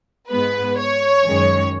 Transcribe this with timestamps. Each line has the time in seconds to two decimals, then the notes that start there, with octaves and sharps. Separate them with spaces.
0.29 G#2 G#3 B3 B4
0.77 C#5
1.26 F#2 D#3 G#3 C#4